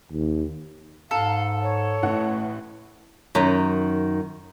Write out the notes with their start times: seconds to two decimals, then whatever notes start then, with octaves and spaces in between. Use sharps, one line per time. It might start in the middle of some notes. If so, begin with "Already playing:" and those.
0.12 D#2
1.11 G#2 A4 F5 A#5
1.62 C#5
2.03 A1 A2 F#5
3.35 F#2 D#3